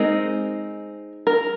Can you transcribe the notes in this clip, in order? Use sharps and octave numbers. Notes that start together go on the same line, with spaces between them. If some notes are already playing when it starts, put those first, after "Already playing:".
Already playing: G#3 C4 D#4 A#4
A#4